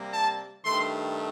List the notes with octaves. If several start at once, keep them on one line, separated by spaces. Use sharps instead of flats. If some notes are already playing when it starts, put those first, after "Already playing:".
Already playing: C3 G3 A#3
A5
G2 D#3 A3 C6